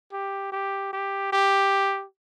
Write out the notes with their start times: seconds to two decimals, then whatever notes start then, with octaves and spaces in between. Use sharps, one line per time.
0.12 G4
0.52 G4
0.93 G4
1.32 G4